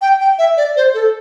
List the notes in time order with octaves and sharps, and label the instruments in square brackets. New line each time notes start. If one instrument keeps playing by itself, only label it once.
[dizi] G5
G5
E5
D5
C5
A4